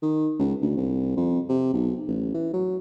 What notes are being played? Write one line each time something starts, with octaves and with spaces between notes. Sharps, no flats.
D#3
C#2
D2
C2
F2
C3
B1
A1
E3
F#3